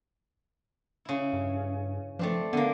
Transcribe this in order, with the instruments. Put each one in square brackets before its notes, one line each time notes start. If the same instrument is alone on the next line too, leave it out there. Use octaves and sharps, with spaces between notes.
[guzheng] C#3 E4
[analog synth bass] G2
[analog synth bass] F3 [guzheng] A3 C4 D4
[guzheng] D3 A#3 [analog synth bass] B3